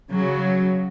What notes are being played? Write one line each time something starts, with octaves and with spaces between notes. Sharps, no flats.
C#3 F#3